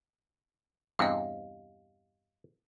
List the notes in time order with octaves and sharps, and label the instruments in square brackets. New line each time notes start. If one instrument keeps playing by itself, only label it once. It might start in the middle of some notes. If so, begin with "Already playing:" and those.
[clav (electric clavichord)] E2 G2 C3 [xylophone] D#5 F5